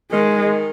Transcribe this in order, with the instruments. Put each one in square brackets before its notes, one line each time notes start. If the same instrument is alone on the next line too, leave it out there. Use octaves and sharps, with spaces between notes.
[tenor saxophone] D#3 [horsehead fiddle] G#3